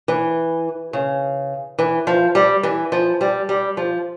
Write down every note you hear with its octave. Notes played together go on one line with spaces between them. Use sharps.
E3
C#3
E3
F3
G3
E3
F3
G3
G3
F3